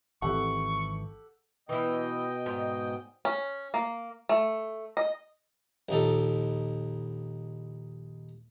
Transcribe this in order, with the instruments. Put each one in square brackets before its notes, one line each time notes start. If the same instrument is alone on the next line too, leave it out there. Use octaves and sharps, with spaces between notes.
[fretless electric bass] G#1 E3 C4 [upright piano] G4 A4 F#5 [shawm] C#6
[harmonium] B2 D#5 G5 [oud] E3 E4
[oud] G#2
[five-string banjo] C#4
A#3
A3
D#5
[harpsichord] A#1 D#2 D#4 A4